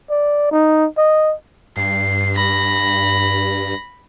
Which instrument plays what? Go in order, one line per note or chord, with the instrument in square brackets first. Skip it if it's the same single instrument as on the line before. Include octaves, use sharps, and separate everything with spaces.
[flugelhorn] D5
D#4
D#5
[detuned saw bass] G2 [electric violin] C7
[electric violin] B5 A#6